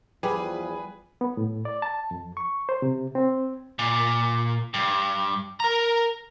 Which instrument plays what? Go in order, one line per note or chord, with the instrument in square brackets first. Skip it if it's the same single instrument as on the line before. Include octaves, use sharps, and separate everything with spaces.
[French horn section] E2 F3 [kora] G3 [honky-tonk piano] G#4 B4
[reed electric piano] B3
A2
D5
A5
F2
C#6
C5
C3
C4
[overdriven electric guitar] A#2
G2
A#4 A#5